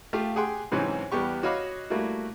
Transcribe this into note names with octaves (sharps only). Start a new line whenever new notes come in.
A3 F4 G4 F5
G4 G#4 F#5 G5 C6
G#2 C3 E3 F#3 C#4 F#4
E2 G3 B3 G4 C#6
F#4 C#5 D#5 F5 B5 D6
G3 A3 A#3 E4 F#4